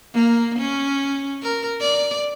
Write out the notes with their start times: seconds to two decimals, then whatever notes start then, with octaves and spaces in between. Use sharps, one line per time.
0.14 A#3
0.59 C#4
1.43 A#4
1.81 D5